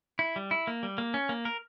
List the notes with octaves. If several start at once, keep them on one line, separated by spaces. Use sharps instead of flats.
E4
G3
E4
A#3
G3
A#3
C#4
A#3
A#4